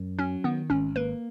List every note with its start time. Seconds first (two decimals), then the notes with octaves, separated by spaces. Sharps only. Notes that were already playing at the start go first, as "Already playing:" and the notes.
Already playing: F#2
0.18 F#3 C#4
0.44 D#3 B3
0.70 G#1 C#4
0.96 A#3 B4